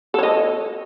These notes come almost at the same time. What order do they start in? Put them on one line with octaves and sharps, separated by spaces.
A4 C#5 D#5